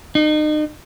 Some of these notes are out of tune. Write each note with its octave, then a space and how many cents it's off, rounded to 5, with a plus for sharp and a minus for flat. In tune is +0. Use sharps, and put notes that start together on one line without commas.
D#4 -35